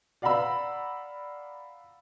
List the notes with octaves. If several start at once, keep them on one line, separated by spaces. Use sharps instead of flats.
D5 F5 F#5 A#5 B5 E6